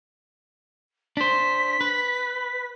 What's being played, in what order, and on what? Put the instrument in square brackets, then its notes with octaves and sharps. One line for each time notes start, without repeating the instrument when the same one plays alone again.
[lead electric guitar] D4 C5 [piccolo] B6
[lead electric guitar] B4